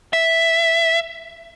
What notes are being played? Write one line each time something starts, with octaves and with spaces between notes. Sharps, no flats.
E5